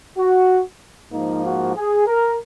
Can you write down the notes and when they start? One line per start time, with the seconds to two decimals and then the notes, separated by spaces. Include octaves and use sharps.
0.18 F#4
1.12 G#2 F3 A#3 D#4
1.44 F#4
1.76 G#4
2.07 A#4